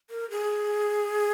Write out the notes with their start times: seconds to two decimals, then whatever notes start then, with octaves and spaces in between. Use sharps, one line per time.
0.10 A#4
0.30 G#4